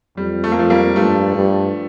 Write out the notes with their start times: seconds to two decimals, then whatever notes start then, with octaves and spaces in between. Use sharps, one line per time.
0.17 F2 G3
0.44 A3
0.52 A#3
0.59 F3 A3
0.70 G3 A#3
0.96 G2 F3 A3
1.36 G2